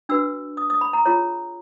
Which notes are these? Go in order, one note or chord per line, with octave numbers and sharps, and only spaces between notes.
D4 F#4 B4 E6
D#6
D#6
B5
A#5
F4 G#4 C#5 A#5